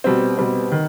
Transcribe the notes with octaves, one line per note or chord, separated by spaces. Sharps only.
B2 G3 C4
B2 G3 C4
D#3